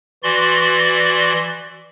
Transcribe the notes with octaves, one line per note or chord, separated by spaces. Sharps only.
E3 F#4 D5 C6